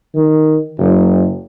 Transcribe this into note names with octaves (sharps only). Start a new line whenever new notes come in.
D#3
F#1